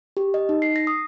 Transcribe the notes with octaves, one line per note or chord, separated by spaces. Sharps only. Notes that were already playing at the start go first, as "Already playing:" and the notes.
G4
D#5
D#4
C7
A#6
D#6